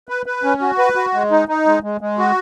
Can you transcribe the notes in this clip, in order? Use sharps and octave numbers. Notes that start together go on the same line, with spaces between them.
B4
B4
C#4
F#4
B4
F#4
G#3
D#4
D#4
G#3
G#3
G#3
F#4